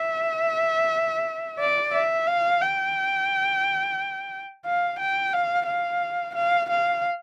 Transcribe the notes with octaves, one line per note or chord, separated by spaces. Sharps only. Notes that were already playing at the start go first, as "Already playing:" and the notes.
Already playing: E5
D5
E5
F5
G5
F5
G5
F5
F5
F5
F5